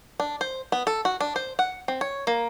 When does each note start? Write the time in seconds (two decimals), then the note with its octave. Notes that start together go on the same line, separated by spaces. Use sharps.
0.20 D4
0.41 C5
0.72 B3
0.87 A4
1.05 F#4
1.21 D4
1.36 C5
1.59 F#5
1.88 C4
2.01 C#5
2.27 A#3